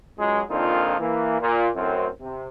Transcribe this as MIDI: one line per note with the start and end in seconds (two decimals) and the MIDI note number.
0.18 0.41 37
0.18 0.41 54
0.18 0.41 56
0.50 0.95 41
0.50 0.95 46
0.50 0.95 51
0.50 0.95 62
0.50 0.95 63
0.50 0.95 65
0.99 1.37 52
0.99 1.37 58
1.41 1.69 46
1.75 2.07 42
1.75 2.07 45
1.75 2.07 60
2.20 2.48 48